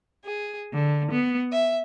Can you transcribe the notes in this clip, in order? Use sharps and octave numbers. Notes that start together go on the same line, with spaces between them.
G#4
D3
B3
E5